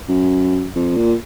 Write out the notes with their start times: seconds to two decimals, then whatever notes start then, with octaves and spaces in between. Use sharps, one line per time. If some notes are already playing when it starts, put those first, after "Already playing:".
0.09 F#2
0.75 F2
0.96 A#2